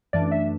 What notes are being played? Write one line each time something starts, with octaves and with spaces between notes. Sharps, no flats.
F#2 E3 A3 D4 D5
E5